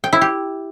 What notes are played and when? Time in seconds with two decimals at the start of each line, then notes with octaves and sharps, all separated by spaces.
0.04 G5
0.13 E4
0.21 G4